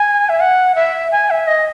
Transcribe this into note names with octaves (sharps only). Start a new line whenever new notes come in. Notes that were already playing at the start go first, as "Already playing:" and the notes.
Already playing: G#5
E5
F#5
E5
G#5
E5
D#5